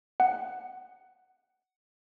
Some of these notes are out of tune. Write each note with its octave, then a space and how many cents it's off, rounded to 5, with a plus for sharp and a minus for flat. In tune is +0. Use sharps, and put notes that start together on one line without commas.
F#5 +10